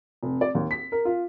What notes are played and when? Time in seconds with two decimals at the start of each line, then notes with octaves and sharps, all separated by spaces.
0.23 F1
0.41 D5
0.55 D#2
0.71 B6
0.92 A#4
1.05 F4